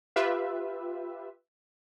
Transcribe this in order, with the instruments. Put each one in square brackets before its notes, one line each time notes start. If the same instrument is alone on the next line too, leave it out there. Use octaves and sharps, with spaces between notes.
[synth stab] F4 G4 B4 E5